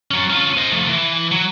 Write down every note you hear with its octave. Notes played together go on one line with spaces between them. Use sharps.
F#3 C#4
C#4 F4
C5 D#5
F3 A3
E3
F#3